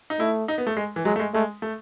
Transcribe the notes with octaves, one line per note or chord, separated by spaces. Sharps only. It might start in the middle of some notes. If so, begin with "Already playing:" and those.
D#4
A3 E4
D#4
B3
A3
G#3
E3
F#3 G#3
A3
G#3
G#3 A3
A3